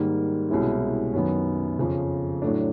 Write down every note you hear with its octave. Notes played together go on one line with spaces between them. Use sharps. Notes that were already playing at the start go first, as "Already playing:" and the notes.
Already playing: G#2 D#3 G3 A#3
C2 B2 G#3 C#4 E4
F#2 D#3 F#3 B3
F2 C#3 F3
A2 F#3 A3 D4